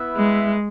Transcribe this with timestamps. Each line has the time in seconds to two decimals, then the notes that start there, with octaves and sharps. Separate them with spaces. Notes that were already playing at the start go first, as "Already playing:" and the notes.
Already playing: B3 E4 B4 E5
0.16 G#3